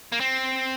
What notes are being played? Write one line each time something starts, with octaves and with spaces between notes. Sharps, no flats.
A#3
C4